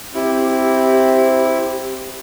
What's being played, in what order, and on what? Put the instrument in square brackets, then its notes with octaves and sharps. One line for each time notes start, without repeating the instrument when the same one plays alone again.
[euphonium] C4 [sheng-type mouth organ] E4 [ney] G4